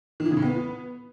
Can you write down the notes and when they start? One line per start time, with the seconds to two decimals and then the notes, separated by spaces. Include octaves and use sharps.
0.20 D#3
0.25 E3
0.31 C#3
0.37 A2
0.42 B3